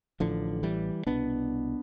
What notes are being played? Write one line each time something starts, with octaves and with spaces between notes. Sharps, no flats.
A1 A2 D3 F3
E3 G3
C2 B2 B3 D4